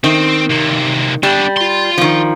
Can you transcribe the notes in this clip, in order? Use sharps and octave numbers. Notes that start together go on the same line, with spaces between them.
D#3 C4
C3 A#3
G3 B3 D4
F4 C6
D#3 F3